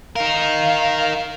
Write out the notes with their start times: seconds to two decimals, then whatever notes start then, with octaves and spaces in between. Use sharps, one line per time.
0.16 D#4 A#4 F5